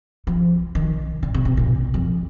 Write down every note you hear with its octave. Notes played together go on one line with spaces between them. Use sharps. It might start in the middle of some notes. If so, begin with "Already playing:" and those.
F3
D#3
D3
C3
C3
A#2
F2